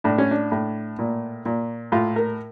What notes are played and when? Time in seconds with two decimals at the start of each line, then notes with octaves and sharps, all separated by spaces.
0.04 A2 D4
0.18 C#4
0.31 D4
0.52 A2
0.99 A#2
1.46 A#2
1.92 A2 F4
2.16 A#4